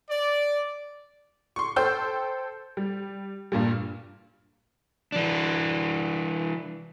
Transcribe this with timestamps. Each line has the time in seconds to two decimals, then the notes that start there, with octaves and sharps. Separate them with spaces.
0.10 D5
1.56 C6 C#6
1.76 A4 C5 G5 C6 E6 G6
2.77 G3
3.52 G2 A#2 G3
5.12 E3 D4